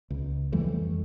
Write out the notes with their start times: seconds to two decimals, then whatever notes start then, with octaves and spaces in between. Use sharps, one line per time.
0.10 C#2
0.52 F2 E3 G3 A3